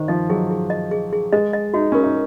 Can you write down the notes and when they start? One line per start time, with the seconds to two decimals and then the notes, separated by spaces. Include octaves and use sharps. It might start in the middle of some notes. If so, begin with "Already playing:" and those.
Already playing: D#3 C5
0.08 F3 D#5
0.30 F#3 G#4
0.51 G#4
0.70 D#5
0.91 G#4
1.13 G#4
1.32 G#3 D#5
1.53 D#5
1.74 D#4 F#4
1.92 C#4 A#4
2.04 D#4